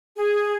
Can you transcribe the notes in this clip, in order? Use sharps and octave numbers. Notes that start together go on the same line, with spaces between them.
G#4